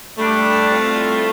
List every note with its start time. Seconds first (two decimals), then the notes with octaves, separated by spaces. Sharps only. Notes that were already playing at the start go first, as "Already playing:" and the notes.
0.18 G3 A3 D4 A4
0.71 A2 G3 C4 F4